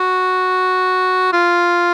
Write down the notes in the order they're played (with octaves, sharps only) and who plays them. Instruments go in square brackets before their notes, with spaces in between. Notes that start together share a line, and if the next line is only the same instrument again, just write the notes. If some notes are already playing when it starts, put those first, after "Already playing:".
Already playing: [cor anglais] F#4
F4